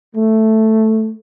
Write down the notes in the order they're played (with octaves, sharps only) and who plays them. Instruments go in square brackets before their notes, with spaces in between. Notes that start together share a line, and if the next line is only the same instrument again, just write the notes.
[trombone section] A3